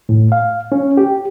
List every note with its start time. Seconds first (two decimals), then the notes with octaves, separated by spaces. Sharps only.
0.09 A2
0.32 F5
0.72 C#4
0.97 G4